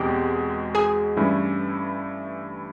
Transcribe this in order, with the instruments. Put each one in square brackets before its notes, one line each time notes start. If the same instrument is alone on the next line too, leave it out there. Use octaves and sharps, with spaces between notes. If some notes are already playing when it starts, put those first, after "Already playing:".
Already playing: [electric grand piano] E2 B2 G#3 C4 [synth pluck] G4 G5
[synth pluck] G#4 G#5
[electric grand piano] G2 E3 A3 C#4 E4